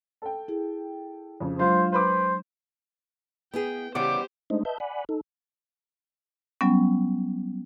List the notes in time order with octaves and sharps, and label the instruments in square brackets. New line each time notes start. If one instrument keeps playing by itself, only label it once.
[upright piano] A4 G5
[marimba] E4 G#4
[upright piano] F2 C#3
[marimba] F#3 G#3 D4 [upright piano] F4 [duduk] C5
[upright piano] B4 B5 D6 [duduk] C5
[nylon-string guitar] B3 E4 G#4 [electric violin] G5
[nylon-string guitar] C#3 [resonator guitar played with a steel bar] E3 G3 B3 [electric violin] G4 C5 [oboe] D6
[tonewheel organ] G#3 A3 D4 D#4 C5 D#5
B4 D#5 E5 A5 G6
D5 F#5 G#5 B5
D#4 A4
[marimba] F#3 G3 B3 C#4